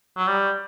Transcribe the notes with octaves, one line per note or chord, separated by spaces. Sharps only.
F#3
G3